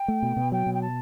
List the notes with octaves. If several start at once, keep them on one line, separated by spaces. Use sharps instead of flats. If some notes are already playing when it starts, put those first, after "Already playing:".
Already playing: G5
A3
B2
B2
F#3 G5
B2
G5
A5